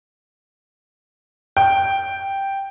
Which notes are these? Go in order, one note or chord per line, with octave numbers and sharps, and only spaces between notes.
G5